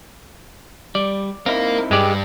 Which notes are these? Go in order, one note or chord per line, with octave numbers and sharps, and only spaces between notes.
G3 D5
C4 D#4 E4 A#4 F5
G2 G#3 G4 D5